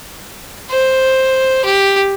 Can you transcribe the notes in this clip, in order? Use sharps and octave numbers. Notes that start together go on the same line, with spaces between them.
C5
G4